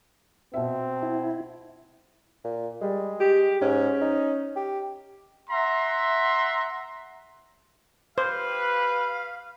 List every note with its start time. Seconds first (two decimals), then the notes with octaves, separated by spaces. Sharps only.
0.54 B2 C4 E5
1.03 E4
2.45 A#2
2.82 G3 G#3
3.20 G4
3.61 G#2 C#4
4.01 D#4
4.56 G4
5.50 E5 F#5 A#5 C6
8.18 G4 B4 C5 F5